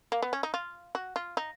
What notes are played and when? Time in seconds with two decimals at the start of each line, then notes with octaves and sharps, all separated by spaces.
0.12 A#3
0.22 B3
0.33 C#4
0.43 D#4
0.54 F4
0.95 F#4
1.16 F4
1.37 D#4